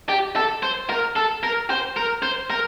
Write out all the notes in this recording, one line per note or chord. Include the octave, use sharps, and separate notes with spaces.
G4
A4
C5
A#4
A4
A#4
C5
A#4
C5
A#4